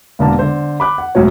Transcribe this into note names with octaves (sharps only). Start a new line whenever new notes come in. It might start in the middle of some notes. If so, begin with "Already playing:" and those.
E1 D3 A#3 A5
D3 C5
B5 D6 F#6
F#5
E1 F#2 A2 F#3 C#5